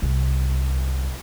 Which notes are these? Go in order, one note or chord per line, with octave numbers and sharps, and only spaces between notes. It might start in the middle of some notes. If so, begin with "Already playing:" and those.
C2